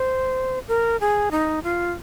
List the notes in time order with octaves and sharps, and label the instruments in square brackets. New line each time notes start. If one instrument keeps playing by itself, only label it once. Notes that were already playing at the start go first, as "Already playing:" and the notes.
Already playing: [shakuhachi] C5
A#4
G#4
D#4
F4